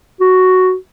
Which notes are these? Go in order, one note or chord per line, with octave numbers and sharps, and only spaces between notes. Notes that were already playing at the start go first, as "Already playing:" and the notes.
F#4